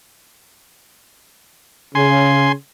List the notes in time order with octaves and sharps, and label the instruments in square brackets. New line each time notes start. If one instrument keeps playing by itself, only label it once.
[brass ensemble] C#3 [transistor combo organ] G#5 C6